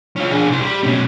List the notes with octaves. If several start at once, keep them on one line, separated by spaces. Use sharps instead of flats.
C#4 F4
D4 G#4
C2 C5
G3
B2 C#4